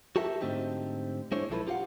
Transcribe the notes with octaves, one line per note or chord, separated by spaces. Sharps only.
F#4 G4 A4 A#4 E5
G#2 D3 A3 C4 D#4 G4
G#3 D4 E4 C5 C#5
B1 F3 E4 A4 B4
F4 G4 A4 F5 F#5